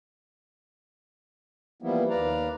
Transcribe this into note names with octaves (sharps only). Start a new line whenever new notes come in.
E3 F3 G3 A#3 B3 E4
D#2 B4 D5 F5 A#5